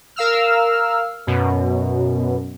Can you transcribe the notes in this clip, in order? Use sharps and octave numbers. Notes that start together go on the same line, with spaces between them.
A#4 F5 E6 F6
F#2 B2